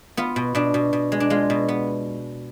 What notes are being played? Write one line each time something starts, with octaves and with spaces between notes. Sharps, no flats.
B3 F4
B2
B2 D4
B2
B2
G#3
D4
G#3 F4
B2
B3